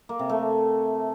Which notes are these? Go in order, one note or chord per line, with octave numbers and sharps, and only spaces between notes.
A#3
C3
A3